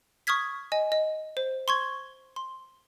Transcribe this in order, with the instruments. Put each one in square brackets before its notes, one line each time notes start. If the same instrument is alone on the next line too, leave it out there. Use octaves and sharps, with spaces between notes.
[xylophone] C#6 D#6 F6 G#6 B6
D#5 G#5
D#5
C5
C6 C#6 G#6
C6